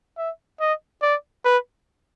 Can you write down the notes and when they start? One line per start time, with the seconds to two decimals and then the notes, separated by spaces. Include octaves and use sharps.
0.18 E5
0.60 D#5
1.02 D5
1.45 B4